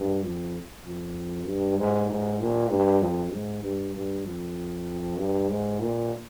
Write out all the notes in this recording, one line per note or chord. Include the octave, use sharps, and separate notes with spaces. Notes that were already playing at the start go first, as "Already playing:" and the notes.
Already playing: G2
F2
F2
G2
G#2
G#2
A#2
G2
F2
G#2
G2
G2
F2
G2
G#2
A#2